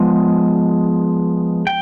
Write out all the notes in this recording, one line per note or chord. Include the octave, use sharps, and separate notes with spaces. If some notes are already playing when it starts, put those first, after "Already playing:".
Already playing: F3 G#3 B3
G5